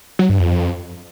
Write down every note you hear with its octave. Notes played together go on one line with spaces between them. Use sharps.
F#3
G2
F2